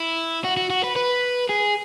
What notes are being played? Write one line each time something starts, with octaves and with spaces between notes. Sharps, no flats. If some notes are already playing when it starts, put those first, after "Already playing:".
Already playing: E4
F#4
F#4
F#4
B4
B4
G#4